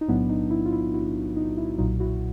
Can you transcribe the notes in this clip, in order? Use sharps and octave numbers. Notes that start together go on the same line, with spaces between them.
D#4
B1 A2 F#3 B3 D4 E4
D#4
E4
F4
E4
E4 F#4
D#4
E4
B1 A#2 F#3 D#4 F4
E4 F#4